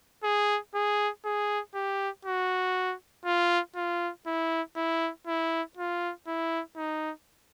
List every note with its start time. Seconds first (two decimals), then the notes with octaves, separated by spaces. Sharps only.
0.24 G#4
0.75 G#4
1.25 G#4
1.74 G4
2.25 F#4
3.25 F4
3.76 F4
4.26 E4
4.76 E4
5.27 E4
5.77 F4
6.27 E4
6.76 D#4